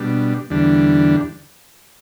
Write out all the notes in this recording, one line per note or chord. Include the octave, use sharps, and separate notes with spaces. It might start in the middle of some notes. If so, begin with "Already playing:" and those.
Already playing: B2 G3 D4
E2 D3 G3 D4